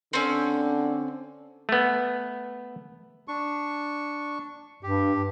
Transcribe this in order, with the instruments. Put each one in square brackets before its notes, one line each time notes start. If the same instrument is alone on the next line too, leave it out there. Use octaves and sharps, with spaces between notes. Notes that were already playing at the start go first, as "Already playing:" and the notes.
[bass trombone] D3 [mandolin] C4 C#4
[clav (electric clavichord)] A3 B3
[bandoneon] D4 C#6
[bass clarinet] G2 [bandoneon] G4